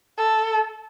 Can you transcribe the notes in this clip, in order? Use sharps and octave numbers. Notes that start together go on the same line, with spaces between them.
A4